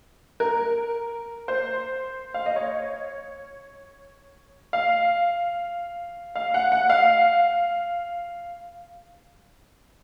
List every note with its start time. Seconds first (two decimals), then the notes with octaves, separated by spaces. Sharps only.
0.40 A#4
1.48 C5
2.34 F5
2.46 D#5
2.56 C#5
4.73 F5
6.36 F5
6.54 F#5
6.72 F#5
6.90 F5